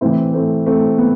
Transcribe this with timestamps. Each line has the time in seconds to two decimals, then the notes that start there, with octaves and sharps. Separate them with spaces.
0.01 A2 E3 C4 E4
0.34 A3 C4
0.66 A3 C4
0.98 B3